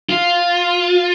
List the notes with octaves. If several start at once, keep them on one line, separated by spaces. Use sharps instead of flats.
F4